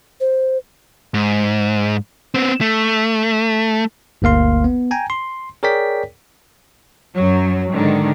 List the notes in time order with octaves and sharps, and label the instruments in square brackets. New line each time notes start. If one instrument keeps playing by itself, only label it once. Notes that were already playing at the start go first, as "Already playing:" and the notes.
[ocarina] C5
[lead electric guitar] G#2
B3 C4
A3
[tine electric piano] G1 D2 A#3 F5 C6
B3
G5 G#5 A#5
C6
G#4 A#4 C#5 D5 G5 B6
[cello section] F#2 F#3
G#2 D3 D#3